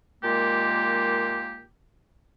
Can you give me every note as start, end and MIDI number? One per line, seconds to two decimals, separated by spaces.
0.22 1.63 46
0.22 1.63 51
0.22 1.63 56
0.22 1.63 58
0.22 1.63 67